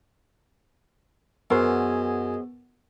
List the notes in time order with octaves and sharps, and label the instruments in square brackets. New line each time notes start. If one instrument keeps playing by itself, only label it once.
[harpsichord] F#2 [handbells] B3 [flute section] G#4 D#5 [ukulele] A#4 C5